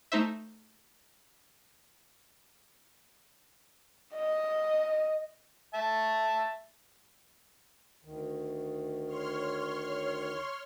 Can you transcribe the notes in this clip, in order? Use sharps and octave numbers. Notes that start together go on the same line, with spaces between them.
A3 D#4 C5 E5
D#5
E5 A5
D2 D#3
C#5 C6 F6